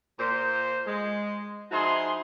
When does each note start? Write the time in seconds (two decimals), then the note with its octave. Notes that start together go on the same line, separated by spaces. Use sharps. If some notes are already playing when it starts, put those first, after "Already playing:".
0.19 A#2 C5
0.87 G#3
1.72 F3 D#4 E4 F#4 G#4 C6